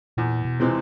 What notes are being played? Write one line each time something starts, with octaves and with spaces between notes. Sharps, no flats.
E2 A#2
B2
C3 E3 G#3 C4